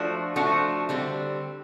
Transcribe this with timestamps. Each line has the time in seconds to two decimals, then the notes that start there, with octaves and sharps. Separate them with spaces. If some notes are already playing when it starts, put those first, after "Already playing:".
Already playing: F3 A3 D4 F#4
0.36 F3 A3 D4 F#4
0.89 D3 G3 C4